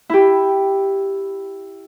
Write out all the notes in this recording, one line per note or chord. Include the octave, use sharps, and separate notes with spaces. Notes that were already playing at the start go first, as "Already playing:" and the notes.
E4 G4